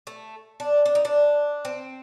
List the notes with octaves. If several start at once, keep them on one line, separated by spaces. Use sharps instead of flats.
A3
D4
D4
D#4
D4
C4